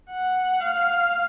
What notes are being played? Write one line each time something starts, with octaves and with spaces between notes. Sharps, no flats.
F#5
F5